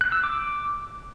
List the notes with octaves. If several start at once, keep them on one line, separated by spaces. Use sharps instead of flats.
F#6
E6
D6